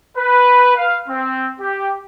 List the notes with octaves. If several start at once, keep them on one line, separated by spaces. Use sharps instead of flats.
B4
F5
C4
G4